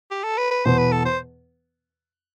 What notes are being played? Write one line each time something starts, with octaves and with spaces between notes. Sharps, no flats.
G4
A4
B4
B4
E2 B2 B3 C5
B4
A4
C5